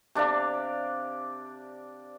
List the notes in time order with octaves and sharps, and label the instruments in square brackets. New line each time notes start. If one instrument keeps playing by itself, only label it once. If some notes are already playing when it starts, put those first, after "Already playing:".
[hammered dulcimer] C3 D4 D5 F5